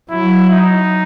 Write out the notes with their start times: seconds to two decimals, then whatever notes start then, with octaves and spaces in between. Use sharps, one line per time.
0.10 F#3 E4
0.51 D#4